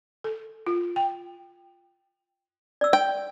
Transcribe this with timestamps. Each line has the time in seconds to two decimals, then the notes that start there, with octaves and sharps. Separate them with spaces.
0.24 A4
0.67 F4
0.96 G5
2.81 D5 E6
2.93 G5